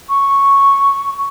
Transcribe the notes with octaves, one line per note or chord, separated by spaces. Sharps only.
C#6